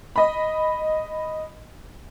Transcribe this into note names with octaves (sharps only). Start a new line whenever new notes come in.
D#5 B5